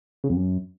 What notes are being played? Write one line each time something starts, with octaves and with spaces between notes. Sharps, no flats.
C#3
F2
F#2